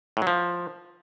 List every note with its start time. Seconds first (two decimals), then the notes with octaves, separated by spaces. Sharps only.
0.17 A2
0.22 F#3
0.27 F3